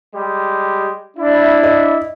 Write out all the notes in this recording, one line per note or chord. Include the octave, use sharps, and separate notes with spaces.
G3 G#3 G4
D4 E4
D#5